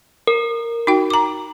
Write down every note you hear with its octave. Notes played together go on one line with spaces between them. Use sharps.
A#4
D#4 F#4 G5
A#5 D6